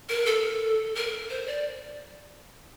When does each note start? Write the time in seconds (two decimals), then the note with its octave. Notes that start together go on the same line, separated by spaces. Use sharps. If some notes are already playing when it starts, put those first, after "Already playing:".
0.09 A#4
0.26 A4
0.95 A#4
1.30 C5
1.47 D5